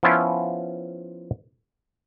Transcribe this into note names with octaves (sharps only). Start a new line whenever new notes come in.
F3 B3 C#4 E4 F4